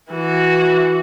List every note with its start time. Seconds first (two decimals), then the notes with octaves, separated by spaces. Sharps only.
0.11 E3 F#4